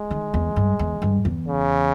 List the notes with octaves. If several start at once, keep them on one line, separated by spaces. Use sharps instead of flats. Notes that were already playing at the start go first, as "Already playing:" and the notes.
Already playing: G#3
D#3
E2
G2
E2
G2
E2
C#3